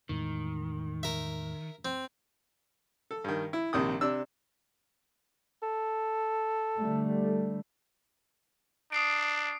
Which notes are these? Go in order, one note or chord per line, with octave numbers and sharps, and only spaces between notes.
E2 A2 D#3 G#3
A#4 E5
C4
A4
G2 D#3
E4
A#1 C3 D#3 D#6
C3 D4 E6
A4
D3 G3 A3
D4 D#6 C7 D7